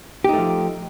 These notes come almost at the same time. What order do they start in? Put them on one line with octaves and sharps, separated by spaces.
G4 D#4 A3 F3